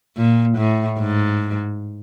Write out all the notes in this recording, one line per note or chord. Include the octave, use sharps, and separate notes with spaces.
A#2
A2
G#2